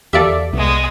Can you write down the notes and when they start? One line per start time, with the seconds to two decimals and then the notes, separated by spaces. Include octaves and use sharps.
0.13 E2 A#3 F4 G4 A4 D5 E5
0.53 C2 G#3 B3